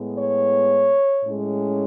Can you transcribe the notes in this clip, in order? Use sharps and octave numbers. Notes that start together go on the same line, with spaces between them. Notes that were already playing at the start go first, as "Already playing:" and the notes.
Already playing: A2 G#3 B3
C#5
A2 G#3 C#4